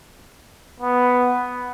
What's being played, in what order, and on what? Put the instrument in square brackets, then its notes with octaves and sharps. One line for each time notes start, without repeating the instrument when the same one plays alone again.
[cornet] B3